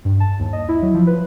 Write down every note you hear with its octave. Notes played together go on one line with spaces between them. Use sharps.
G2
A5
D#2
D#5
E4
F#3
F3
B4